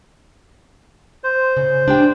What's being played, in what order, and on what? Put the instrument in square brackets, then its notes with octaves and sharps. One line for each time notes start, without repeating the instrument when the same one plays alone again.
[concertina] C5
[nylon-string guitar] C#3
D4 G4 G5